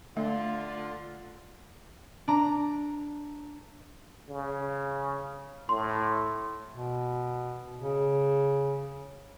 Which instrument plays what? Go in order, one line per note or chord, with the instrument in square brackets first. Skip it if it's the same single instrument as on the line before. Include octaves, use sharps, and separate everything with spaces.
[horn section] D3 F4 [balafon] A3
[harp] D4 A#5
[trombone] C#3
[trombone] A2 [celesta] C6
[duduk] B2
C#3